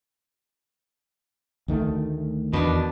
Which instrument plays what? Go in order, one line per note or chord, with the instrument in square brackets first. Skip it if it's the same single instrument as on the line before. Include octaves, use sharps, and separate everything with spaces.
[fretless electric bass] D2 D#3 A3
[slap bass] E2 D#3 [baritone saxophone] B2 [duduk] D4